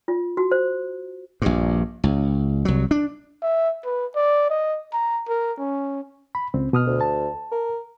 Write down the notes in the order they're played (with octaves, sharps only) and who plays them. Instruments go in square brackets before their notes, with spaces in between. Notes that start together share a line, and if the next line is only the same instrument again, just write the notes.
[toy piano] F4
F#4
C5
[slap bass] A#1 G2
C#2
C2 F#3
D4
[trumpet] E5
B4
D5
D#5
A#5
A#4
C#4
[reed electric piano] B5
C#2 C4
B2 D#6 F6
[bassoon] D2
[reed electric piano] A5
[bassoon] A#4